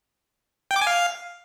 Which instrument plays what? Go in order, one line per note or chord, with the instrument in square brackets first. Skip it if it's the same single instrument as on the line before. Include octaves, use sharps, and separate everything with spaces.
[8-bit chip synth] G5
D6
G#5
F5